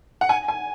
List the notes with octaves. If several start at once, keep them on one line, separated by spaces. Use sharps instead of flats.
F#5
G#5
G#5